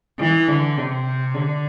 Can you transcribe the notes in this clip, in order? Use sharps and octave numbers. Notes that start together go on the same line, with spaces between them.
E3
D3
C3
D3